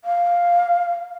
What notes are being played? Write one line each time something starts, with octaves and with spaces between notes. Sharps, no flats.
F5